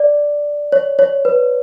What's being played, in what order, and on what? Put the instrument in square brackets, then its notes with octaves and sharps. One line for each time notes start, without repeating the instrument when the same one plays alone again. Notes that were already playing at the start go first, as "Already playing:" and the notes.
Already playing: [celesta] D5
C#5
C#5
B4